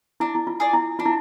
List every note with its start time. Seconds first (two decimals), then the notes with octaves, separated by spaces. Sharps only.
0.20 D4 E4
0.35 E4
0.47 F4
0.60 G#4 D5
0.73 E4
0.99 D4 F4
1.06 E4